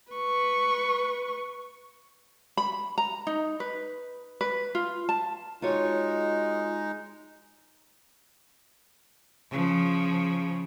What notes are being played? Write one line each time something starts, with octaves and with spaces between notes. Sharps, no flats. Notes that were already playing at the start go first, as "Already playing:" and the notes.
B4 C#6
B5
A#5
D#4
B4
B4
F4
A5
G#3 D#4 F4 F#4 C#5
C#3 F3